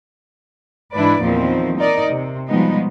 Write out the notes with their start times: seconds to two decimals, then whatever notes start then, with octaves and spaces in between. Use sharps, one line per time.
0.92 G#2 E3 D4 E4 B4 D5
1.21 E2 A#2 D#3 F3 C4
1.77 D#4 A#4 D5 D#5
2.10 C3
2.48 B2 F3 G3 G#3 B3 D#4